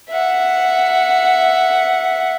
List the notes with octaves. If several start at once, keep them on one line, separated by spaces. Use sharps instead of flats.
E5 F#5